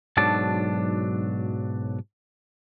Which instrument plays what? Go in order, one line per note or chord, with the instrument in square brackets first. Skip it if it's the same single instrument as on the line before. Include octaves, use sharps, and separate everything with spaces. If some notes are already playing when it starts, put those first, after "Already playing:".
[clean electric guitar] B1 G#2 F#3 D4 A5